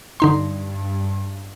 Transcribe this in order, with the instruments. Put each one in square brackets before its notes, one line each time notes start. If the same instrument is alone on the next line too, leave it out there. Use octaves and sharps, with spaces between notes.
[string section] G2 [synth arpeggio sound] D3 D#4 C6